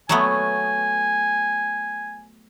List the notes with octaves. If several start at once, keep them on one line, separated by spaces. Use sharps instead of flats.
F#3 A3 B3 G#5